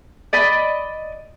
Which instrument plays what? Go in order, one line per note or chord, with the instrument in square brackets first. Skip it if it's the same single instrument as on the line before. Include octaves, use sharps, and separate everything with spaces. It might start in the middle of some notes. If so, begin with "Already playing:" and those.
[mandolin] D5 D#5 B5